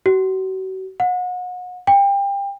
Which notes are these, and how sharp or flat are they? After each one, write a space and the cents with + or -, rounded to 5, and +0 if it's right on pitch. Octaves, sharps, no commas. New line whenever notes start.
F#4 +35
F#5 -35
G5 +25